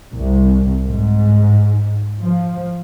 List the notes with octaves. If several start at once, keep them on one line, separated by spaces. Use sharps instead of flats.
C2
G#2
F3